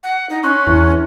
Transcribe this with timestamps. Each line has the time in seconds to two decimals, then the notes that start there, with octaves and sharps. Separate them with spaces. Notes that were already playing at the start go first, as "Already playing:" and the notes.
0.03 F#5
0.30 D#4
0.43 C#4 C6 C#6 F#6
0.67 E2 E4